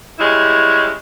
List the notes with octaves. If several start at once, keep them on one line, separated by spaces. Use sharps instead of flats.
C#3 G3 G#3 C#4 E4